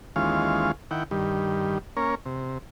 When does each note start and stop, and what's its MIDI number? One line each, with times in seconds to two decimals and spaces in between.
0.16 0.72 39
0.16 0.72 52
0.16 0.72 56
0.16 0.72 61
0.16 0.72 65
0.16 0.72 77
0.91 1.04 51
0.91 1.04 64
0.91 1.04 78
0.91 1.04 79
1.11 1.78 43
1.11 1.78 51
1.11 1.78 55
1.97 2.15 58
1.97 2.15 61
1.97 2.15 70
1.97 2.15 73
2.26 2.58 48